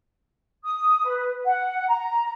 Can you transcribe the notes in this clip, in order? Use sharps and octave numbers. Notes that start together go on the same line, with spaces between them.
D#6
B4
F#5
A#5